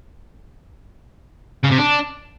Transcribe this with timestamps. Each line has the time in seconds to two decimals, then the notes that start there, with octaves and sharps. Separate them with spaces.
1.64 C#3
1.72 C3
1.79 D4